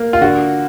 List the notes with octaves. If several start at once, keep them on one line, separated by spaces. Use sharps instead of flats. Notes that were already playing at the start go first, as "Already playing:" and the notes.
Already playing: A#3
F4
D3 F#4